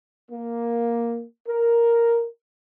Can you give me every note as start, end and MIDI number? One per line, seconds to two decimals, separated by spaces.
0.31 1.23 58
1.48 2.26 70